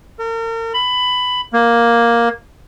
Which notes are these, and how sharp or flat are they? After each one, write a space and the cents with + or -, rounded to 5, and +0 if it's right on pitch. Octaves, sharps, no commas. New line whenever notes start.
A#4 -40
B5 +15
A#3 +5